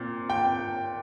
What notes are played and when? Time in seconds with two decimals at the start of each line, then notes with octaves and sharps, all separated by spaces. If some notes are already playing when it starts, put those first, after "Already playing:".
Already playing: A#2 C4
0.30 G5